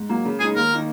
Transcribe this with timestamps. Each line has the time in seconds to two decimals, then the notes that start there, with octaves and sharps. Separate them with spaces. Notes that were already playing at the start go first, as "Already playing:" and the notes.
Already playing: G#2
0.09 F#3 A#3
0.25 C#3
0.40 G#3 D#4 G#4
0.56 D#2 A#4
0.71 D#3 A#3 D#4